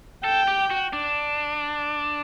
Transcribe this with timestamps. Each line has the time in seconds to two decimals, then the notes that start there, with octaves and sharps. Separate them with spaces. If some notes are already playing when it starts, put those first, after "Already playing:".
0.24 A4 G5
0.48 G4
0.70 F#4
0.93 D4